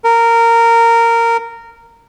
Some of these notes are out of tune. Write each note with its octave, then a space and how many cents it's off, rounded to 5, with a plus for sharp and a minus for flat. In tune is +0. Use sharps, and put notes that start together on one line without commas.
A#4 -15